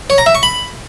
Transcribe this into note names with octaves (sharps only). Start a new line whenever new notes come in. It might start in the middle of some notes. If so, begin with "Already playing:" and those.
C#5
A#5
E5
C#6
B5